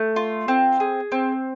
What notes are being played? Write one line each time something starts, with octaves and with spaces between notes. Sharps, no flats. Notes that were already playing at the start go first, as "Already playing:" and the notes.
Already playing: A3
F4
C4
G#4
C4